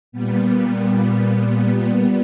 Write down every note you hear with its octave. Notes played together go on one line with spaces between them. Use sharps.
A#2 G3 B3